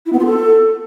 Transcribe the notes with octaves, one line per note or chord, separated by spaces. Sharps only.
E4
B3
F4
A4